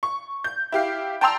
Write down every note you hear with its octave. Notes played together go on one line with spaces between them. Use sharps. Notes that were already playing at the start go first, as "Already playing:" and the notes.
C#6
G6
E4 G4 F5
G5 A5 A#5 C6 E6 F7